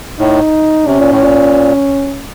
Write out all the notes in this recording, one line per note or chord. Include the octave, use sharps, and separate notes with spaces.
A2 D#4
C3 C#4
A#2
A2
A#2